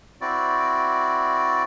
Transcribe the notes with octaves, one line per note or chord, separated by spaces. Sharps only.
C4 E4 F#4 D5